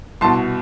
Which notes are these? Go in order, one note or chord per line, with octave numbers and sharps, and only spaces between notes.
C2 B2 A5 C6